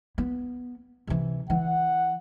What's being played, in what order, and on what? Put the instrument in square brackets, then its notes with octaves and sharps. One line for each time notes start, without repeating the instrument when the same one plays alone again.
[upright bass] B3
C3 E3
[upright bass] E3 [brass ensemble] F#5